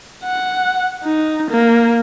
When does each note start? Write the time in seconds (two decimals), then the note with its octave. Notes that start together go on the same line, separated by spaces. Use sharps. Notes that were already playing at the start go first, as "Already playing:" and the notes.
0.24 F#5
1.04 D#4
1.51 A#3